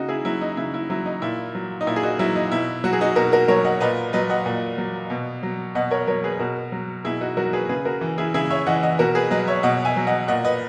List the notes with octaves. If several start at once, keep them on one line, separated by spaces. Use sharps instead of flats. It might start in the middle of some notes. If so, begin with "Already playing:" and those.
Already playing: C#3 D#4 F#4
E4 G#4
F#3 E4
D#4
C#3 E4
E4
F#3 E4
D#4
A#2 E4
F#3
D#4
A#2 E4
G#4
D#4 F#4
F#3 E4
D#4
B2 E4
F#3 F#4
G#4
D#4 F#4
B2 F#4 A#4
F#4 A#4
F#3 A#4 C#5
D#5 F#5
A#2 B4 D#5
F#3 B4 D#5
D#5 F#5
A#2
F#3
B2
F#3
B2 D#5 F#5
A#4 C#5
F#3 A#4 C#5
G#4 B4
B2 F#4 A#4
F#3
B2 E4 G#4
D#4 F#4
F#3 F#4 A#4
G#4 B4
C#3 G#4 B4
F#4 A#4
E3
E4 G#4
C#3 E4 G#4
C#5 E5
E3 D#5 F#5
D#5 F#5
B2 F#4 A#4
G#4 B4
F#3 B4 D#5
C#5 E5
B2 D#5 F#5
E5 G#5
F#3
D#5 F#5
A#2 D#5 F#5
B4 D#5